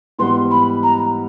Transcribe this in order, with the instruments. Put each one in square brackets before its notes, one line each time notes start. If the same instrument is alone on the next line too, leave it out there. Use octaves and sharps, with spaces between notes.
[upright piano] G#2 E3 G3 B3 [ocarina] C6
[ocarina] B5
A#5